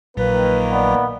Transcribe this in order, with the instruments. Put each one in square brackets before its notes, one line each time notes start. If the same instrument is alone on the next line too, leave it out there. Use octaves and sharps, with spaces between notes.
[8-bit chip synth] A#1 A#2 F#3 [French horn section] D#3 A#3 [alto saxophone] B4
[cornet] B3 [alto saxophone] D5